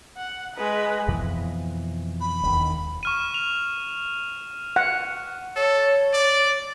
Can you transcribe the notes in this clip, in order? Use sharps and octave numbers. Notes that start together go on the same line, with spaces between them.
F#5
G#3 B4
F2 B2 E3
B5
E1 D#2
C#6 F6 D#7
F7
F#5
A4 C#5
D5